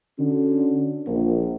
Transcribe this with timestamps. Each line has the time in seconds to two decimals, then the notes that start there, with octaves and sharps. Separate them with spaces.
0.19 D3 C#4 F#4
1.07 A#1